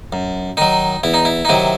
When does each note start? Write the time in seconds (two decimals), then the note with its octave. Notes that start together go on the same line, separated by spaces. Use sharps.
0.13 F#2
0.57 D#3 F#3 D#4
1.04 E2 E4
1.14 D#4
1.25 E4
1.45 D#4
1.49 C3 D#3 F#3 E4